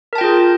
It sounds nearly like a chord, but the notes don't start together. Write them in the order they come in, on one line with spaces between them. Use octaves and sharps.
A#4 A5 G5 F4 G#4